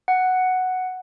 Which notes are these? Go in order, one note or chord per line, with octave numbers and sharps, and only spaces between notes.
F#5